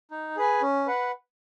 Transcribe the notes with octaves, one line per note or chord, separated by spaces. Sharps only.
D#4
G#4 B4 G#5
C#4
B4 F#5